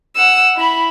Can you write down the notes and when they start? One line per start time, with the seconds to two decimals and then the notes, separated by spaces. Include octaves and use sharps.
0.17 F#5 E6
0.57 E4 B5